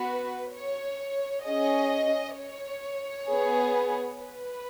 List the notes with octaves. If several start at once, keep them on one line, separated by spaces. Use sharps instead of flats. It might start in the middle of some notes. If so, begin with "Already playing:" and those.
Already playing: B3 F#4 B4
C#5
C#4 G#4 D#5
C#5
B3 G#4
B4